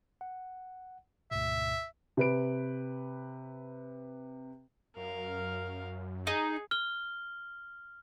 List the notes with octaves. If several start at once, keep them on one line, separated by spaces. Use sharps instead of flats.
F#5
D2 G#2 B2 E5
C3 B4 D7
F#2 A#4 F5
D#4 G#4
F6 G7